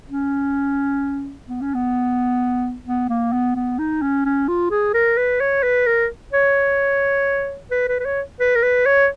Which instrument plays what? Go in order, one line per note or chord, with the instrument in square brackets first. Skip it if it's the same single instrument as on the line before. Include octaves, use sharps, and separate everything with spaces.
[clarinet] C#4
B3
C#4
B3
B3
A#3
B3
B3
D#4
C#4
C#4
F4
G#4
A#4
B4
C#5
B4
A#4
C#5
B4
B4
B4
C#5
B4
A#4
B4
C#5